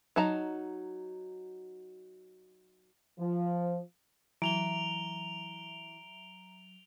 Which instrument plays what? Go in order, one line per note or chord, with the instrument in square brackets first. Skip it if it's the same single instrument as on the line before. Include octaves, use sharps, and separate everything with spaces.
[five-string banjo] F#3 D#4 A5 A#5
[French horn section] F3
[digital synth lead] E3 [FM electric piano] F#3 E5 [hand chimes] A#5 [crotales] D7 F7 G7